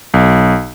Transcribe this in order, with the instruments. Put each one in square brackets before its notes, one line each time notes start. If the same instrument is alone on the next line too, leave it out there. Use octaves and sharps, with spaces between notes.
[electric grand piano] B1